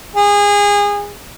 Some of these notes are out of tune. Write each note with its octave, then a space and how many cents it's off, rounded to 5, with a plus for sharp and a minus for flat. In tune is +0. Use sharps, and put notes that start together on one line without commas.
G#4 -25